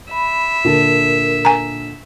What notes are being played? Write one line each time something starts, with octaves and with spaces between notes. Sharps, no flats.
E5 B5
A#2 D3 A#4 A5
G#5 A#5